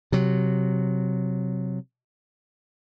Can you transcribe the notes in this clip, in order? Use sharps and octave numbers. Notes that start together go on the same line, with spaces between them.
C3 F#3